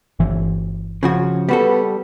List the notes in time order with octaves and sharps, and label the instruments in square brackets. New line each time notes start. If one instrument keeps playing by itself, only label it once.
[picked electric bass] G1 E3
[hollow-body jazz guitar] C#3 F3 F#4
[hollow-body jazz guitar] G3 F#4 A4 [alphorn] B3